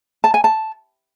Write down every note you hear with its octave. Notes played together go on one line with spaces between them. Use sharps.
A5
G#5
A5